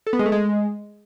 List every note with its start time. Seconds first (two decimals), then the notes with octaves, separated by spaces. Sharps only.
0.07 A4
0.13 B3
0.19 G#3
0.26 A3
0.32 G#3